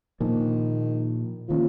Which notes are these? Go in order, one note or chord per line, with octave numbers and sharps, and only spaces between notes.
A#2 D#3 F3 A#3
D#3 F3 A#3 C#4